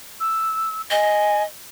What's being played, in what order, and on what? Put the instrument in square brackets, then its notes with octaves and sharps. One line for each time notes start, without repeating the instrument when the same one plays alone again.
[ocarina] E6
[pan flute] D#5 [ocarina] G#5